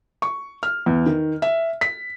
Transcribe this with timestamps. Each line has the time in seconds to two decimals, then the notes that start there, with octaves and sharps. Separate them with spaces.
0.22 C#6
0.63 F6
0.86 E2
1.06 D#3
1.42 E5
1.81 B6